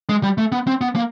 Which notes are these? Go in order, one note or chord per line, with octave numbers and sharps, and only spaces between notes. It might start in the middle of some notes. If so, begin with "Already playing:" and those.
G#3
G3
A3
B3
C4
B3
A#3